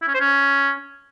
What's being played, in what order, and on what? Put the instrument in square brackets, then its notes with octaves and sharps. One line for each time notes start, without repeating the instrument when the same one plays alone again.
[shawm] E4
C#4
C5
C#4